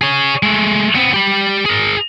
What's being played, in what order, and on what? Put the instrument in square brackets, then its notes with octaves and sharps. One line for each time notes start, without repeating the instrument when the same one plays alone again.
[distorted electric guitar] G#4 C#5
G#3 A3
B3 C4
G4 B5
G#4 A#4